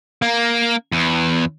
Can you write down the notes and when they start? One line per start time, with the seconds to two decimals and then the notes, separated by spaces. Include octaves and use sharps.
0.22 A#3
0.92 E2